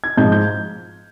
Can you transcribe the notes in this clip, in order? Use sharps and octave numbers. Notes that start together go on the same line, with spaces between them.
G#6
G#2 F3 G6
G6